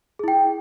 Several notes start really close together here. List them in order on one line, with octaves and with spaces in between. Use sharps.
G#4 E4 G5